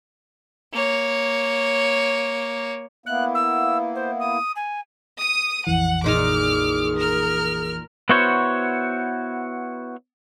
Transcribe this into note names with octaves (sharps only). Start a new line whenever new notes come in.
A#3 C#5
A#3 B3 E4 F#6
E6
C5
D#6
G#5
D#6 D#7
A#1 F2 E3 F#5
A#2 D#4 G#4 D6 F6
A#4 F6
B3 E4 F#4 C5 C#5